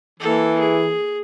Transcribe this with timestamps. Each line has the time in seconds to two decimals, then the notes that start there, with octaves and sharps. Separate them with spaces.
0.20 E3 A#3 A4
0.59 G#4